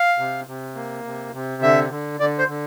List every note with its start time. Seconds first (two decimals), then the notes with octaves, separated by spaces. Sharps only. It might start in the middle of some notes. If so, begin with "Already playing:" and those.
Already playing: F5
0.19 C3
0.47 C3
0.75 A#3
1.04 C3
1.33 C3
1.62 D3 E5
1.90 D3
2.20 D3 D5
2.39 C5
2.48 D3